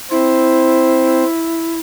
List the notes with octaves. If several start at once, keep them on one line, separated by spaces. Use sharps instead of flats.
C4 E4 C5